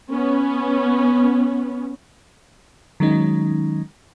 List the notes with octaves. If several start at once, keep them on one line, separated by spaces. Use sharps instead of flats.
B3 C#4
D#3 F#3 G#3 C#4 D#4